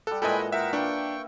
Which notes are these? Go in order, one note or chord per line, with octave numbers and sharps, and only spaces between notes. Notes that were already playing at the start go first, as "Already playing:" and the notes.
G3 A4 F#5
A#2 E3 G#3 A4 D#5 G5 G#5 B5
A#4 E5 F#5 G5
A#3 D4 B4 E5 G5 C#6